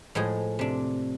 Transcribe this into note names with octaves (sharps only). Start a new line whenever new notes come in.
A2 F3 G#3 G#4
C3 D4